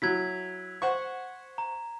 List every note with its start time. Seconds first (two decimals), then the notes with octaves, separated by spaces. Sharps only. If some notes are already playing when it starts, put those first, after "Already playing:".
0.02 F#3 E4 G#6 B6
0.82 C5 F#5 C#6
1.58 A#5